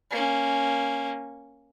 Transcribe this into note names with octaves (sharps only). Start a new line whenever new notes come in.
A#3 C#4